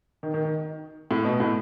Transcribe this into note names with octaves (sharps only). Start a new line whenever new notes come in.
D#3
D#3
D#3
A2
B2
A2